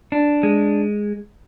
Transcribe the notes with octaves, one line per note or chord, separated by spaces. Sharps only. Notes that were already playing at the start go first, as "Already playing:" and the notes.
D4
G#3